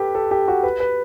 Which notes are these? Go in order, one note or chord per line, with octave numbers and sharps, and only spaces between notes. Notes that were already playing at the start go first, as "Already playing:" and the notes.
Already playing: G4 A4 B4
A4
G4
F#4
B4
B4